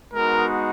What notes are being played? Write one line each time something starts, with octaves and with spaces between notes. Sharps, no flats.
G#3 B3 D#4 F#4 A#4